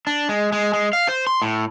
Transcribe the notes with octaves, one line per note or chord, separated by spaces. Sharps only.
D4
G#3
G#3
G#3
F5
C5
C6
A2